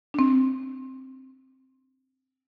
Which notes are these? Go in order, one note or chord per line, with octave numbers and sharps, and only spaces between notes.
C4 D4